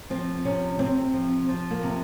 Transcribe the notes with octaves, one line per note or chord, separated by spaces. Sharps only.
F3 C4
C3 C#4
C3 C4
F3
F3
A#3
C3